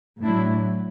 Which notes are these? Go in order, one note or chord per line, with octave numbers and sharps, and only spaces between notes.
A2 F#3 D4 E4